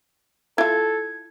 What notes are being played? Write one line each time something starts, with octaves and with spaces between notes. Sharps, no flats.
E4 F4 A4 G#6